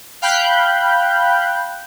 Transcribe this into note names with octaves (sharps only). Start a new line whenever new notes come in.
F5 G5 B5 F#6 G6